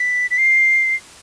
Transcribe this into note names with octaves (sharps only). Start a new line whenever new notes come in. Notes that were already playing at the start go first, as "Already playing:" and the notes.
Already playing: B6
B6
C7